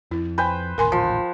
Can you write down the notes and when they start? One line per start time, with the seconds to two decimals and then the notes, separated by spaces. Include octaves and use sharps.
0.11 F2 E4
0.38 B4 C5 G5 G#5
0.78 A1 D#2 A#2 A#4 G#5 C6
0.92 F3